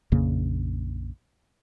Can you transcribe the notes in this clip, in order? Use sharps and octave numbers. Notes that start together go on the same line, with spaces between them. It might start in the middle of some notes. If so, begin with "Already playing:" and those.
A#1 F2 C#3 A#3